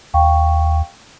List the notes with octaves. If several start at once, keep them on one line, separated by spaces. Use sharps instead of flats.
D#2 F5 G5 C#6